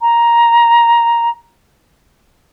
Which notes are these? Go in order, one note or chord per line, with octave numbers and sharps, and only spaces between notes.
A#5